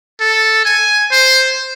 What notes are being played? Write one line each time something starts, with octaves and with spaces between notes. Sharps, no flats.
A4
G#5
C5